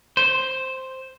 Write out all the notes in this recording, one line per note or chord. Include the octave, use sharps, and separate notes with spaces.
C5